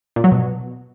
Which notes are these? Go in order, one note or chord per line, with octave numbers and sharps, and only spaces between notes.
A#2
F#3
B2